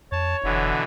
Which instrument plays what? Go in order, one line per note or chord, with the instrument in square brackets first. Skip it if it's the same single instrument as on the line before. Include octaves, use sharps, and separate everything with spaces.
[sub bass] F2 [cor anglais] C#5 [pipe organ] A5
[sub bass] F1 [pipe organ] B2 D3 E3